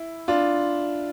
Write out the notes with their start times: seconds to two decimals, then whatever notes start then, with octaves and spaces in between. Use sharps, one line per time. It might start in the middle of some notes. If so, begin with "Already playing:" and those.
Already playing: E4
0.28 D4 F4